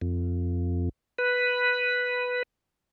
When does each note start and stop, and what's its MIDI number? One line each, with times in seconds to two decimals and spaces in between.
0.02 0.89 41
1.18 2.43 71